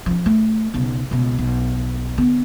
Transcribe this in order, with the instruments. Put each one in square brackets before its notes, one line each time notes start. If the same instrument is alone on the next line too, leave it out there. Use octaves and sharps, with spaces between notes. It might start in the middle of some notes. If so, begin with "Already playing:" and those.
[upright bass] F3 C#4
A3
B1 C#3
C#2 B2
B1
D3 B3